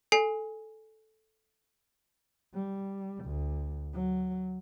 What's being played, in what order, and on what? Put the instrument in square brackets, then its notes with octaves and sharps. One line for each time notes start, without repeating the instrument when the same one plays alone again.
[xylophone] A4 G#5 C7
[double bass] G3
D2
F#3